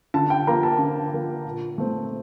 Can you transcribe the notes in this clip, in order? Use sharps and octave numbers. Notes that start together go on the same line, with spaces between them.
D3 A5
G5
F3 A#3 A#5
A5
D3
F3 A#3
A#2
A3 C4